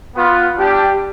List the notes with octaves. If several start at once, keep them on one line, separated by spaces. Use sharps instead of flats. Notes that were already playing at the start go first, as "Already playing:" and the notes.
B3 F4
G3 D4 G4